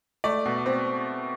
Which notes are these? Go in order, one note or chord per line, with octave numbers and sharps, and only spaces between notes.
A3 D5
B2
C4